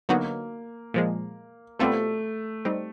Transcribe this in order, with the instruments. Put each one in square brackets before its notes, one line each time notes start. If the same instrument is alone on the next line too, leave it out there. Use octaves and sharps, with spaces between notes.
[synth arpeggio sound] D3 F#3 B3 D#4 F#4 [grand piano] A#3
[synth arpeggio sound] A#2 F3 G#3
[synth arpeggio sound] B2 G3 C4 F4 A4 [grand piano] A3
[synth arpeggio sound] G3 C4 D#4